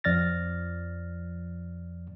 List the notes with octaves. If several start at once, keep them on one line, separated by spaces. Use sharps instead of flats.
F2 F3 D5 F6 A6 A#6